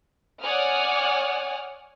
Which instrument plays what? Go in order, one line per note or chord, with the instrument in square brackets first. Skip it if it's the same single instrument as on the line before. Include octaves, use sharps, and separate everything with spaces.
[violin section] C#5 D5 F#5 G#5 D#6 F6